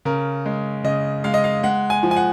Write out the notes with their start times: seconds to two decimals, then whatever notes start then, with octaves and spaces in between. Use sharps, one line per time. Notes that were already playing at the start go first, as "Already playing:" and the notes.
0.05 C#3 A#4
0.46 G#3
0.84 C#3 D#5
1.24 G#3 F5
1.34 D#5
1.44 F5
1.63 G#3 F#5
1.90 G#5
2.03 F3
2.11 G#5
2.17 F#5